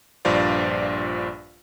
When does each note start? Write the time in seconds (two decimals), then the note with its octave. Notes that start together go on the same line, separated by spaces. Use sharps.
0.25 A#1 G2 F4 C5 D5 F5